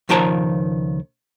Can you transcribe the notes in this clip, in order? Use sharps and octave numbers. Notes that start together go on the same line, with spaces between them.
C#2 D#3 F3 D5 A5 A#5